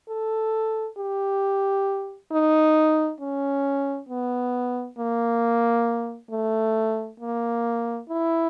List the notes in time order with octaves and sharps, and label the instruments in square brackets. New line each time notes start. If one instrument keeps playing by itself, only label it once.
[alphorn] A4
G4
D#4
C#4
B3
A#3
A3
A#3
E4